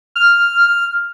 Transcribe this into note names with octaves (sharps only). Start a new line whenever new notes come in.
F6